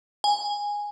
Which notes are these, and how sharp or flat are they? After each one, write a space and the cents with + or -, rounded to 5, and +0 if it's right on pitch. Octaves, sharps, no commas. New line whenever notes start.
G#5 -15